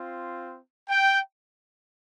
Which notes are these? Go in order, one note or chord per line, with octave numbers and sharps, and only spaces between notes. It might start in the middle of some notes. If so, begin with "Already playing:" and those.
Already playing: C4 F4
G5